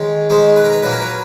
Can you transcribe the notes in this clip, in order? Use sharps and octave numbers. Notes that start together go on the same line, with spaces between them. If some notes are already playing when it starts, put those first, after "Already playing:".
Already playing: D#3 G#3 C#4
D#3 G#3 C#4 C5
B4
A#4
B4
A#2 F#3 A#3 C#4 B4
A#4
B4